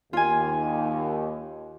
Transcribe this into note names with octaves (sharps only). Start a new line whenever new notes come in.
D#2 F4 G#5